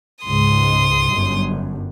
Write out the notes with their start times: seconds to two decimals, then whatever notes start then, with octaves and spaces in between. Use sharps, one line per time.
0.24 C#2 G#2 C6 D#6
1.12 G1 F#2